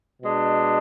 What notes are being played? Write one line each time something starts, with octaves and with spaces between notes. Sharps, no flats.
B2 G#3 D4